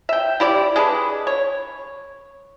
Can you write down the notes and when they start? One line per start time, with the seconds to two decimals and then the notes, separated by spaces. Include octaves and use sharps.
0.09 E5 G5
0.40 E4 G4 D5
0.76 G#3 D4 B4
1.27 C#5